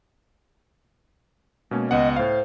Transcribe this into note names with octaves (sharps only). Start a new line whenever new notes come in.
B2 G#3 A#3 C#4
C#2 B3 D#5 F#5
A2 C5 F5